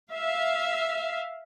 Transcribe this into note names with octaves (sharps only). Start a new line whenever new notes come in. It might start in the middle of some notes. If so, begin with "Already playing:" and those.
E5 F5